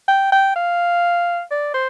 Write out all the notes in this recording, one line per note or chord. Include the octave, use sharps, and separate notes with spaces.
G5
G5
F5
D5
C5